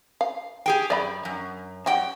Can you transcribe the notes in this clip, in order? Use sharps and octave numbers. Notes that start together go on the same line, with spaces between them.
F5
G4 G#4 G5
F#2 D5 D#5 B5
F#2
F#2 F#3 G3 F#4 G5